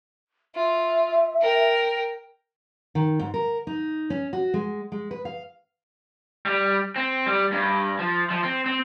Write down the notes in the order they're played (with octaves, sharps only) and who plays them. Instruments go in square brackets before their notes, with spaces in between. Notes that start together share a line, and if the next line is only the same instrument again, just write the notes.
[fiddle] F4 [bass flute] E5
[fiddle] A#4 G5
[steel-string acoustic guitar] D#3
G#2
A#4
D#4
C#4
F#4
G#3
G#3
B4
F5
[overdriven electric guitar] G3
C4
G3
G2
F3
F3
C4
C4